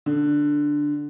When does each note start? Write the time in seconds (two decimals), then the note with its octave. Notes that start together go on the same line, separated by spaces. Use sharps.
0.06 D3